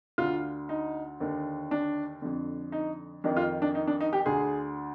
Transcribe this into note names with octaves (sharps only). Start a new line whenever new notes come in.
D2 D3 F4
D#4
D#2 D3
D4
F2 D3
D#4
F2 D#3 D4
F4
D4
D#4
D4
D#4
G4
D2 D3 G#4